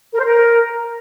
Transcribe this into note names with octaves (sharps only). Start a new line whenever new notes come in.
A#4
C5
A#4